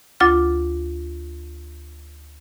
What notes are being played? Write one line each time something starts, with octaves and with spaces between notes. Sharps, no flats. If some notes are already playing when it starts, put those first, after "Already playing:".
D2 F4 D6 A6